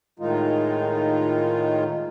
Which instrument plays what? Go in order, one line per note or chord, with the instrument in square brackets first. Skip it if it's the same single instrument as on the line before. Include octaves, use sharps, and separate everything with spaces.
[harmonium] A2 D#3 G#3 D#4 F4